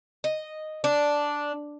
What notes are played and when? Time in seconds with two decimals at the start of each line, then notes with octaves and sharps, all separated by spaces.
0.24 D#5
0.84 D4